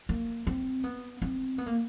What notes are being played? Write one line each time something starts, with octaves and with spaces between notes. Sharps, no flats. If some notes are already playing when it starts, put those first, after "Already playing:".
A#3
C4
B3
C4
B3
A#3